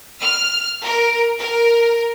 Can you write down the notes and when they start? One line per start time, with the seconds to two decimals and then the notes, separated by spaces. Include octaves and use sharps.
0.21 F6
0.84 A#4
1.39 A#4